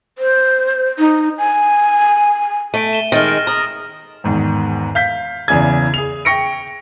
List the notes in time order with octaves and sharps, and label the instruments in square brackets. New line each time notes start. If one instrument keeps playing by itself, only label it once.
[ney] C5
D#4
G#5
[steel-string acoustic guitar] A3 [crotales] D7 D#7
[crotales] E7 G7
[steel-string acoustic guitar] D#3 G#3 [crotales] F6 A6 A#6
[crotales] F6 D7 G7
[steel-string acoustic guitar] A#5 [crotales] D#6 F6
[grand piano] E2 G#2 D#3
F5 G6 B6
E2 C#3 E3 D5 G#5 G#6
G#4 F7
G5 C#6 A#6 C#7 D7